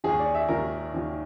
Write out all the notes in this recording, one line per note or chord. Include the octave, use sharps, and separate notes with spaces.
D#2 D#3 G#4
D5
E5
D#2 D#3 A#4
D#2 D#3